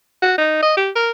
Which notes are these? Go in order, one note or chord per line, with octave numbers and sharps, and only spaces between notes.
F#4
D#4
D#5
G4
A#4